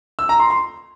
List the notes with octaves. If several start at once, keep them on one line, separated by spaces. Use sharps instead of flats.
E6
A#5
C6
C6